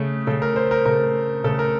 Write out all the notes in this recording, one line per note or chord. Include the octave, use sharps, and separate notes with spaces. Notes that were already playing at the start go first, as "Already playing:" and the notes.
Already playing: C#3 A3
C#3 A3 A4
A#4
C5
A#4
C#3 A3 A#4
C#3 A3 A4
A#4